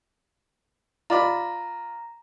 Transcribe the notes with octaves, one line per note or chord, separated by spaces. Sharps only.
F4 D5 A#5 B5